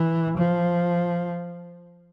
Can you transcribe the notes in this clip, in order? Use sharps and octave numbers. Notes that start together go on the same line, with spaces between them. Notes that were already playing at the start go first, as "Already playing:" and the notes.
Already playing: E3
F3